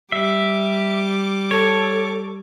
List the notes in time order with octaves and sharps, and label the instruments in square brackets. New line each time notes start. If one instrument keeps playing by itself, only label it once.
[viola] G3 D6 [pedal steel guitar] E5
[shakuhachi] A4 [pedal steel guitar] C#5